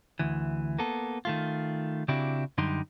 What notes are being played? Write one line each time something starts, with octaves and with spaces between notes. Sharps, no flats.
D2 E3
A#3 B3 A4
D#3 A3 F4
C#3 C4 D4 E4 F#4 G4
F#2 D3 G3 D#4 G4 C6